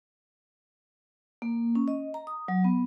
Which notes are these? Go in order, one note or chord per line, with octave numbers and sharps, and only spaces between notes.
A#3
C#4
D#5
A#5
D#6
F#3
B3